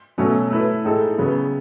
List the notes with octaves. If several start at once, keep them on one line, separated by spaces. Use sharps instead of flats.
B2 F#3 A3 C#4
A3 E4 B4
A2 G#3 D#4 A4
C#3 F#3 B3